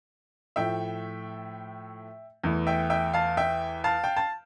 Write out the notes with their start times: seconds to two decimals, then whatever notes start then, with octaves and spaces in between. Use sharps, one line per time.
0.56 A2 F3 A3 E5 G5
2.44 E2 E3 A3
2.67 E5 G5
2.90 E5 G5
3.14 F5 A5
3.37 E5 G5
3.84 F5 A5
4.04 G5
4.17 A5